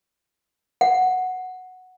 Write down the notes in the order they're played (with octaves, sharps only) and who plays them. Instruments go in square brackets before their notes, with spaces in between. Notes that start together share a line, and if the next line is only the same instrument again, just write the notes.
[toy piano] F#5